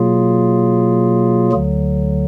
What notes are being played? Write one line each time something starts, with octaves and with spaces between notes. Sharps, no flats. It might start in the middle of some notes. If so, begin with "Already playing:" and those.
Already playing: B2 F#3 A#3 F4 G#4
D2 D3 F#3